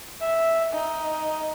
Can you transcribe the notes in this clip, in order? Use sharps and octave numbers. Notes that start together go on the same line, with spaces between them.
E5
D#4